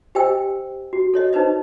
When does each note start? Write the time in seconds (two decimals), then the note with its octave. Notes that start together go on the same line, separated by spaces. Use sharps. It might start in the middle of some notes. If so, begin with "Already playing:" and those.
0.15 G4 C5 D#5 G5 G#5 E6
0.93 F#4
1.14 A4 C#5 D#5
1.33 D#4 B4 C5 D#5